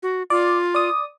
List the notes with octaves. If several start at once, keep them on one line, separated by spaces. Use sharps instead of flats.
F#4
F4 D5
D5 D#6